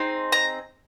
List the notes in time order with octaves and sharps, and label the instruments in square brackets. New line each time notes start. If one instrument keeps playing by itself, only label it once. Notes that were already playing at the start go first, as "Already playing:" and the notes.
Already playing: [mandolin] C4 D#4 G#4
A#5